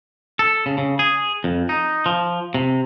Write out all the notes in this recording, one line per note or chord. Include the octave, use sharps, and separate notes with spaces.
A4
C#3
C#3
G#4
F2
D#4
F3
C3